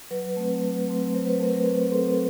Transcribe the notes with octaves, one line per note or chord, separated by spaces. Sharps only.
F#3 B4
A3 C4
F#3
A3 C4
F#3 C5
B4
A3 C4 A#4
A#4
F#3 B4
A3 C4 A4